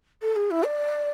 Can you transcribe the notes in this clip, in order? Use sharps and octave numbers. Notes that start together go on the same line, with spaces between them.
A4
G#4
E4
D5